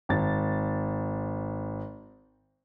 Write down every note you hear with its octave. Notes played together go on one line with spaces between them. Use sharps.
G#1 A6